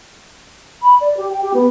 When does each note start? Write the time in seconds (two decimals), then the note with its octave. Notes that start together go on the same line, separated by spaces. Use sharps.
0.82 B5
1.01 D5
1.17 G4
1.30 G5
1.42 G4
1.54 B3